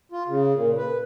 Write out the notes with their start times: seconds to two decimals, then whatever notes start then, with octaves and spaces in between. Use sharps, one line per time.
0.12 F4
0.28 C#3
0.53 A#2
0.77 B4